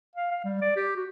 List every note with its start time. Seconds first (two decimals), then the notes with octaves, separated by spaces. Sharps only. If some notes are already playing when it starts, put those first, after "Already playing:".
0.16 F5
0.32 F5
0.44 G3
0.62 D5
0.77 G4
0.96 F#4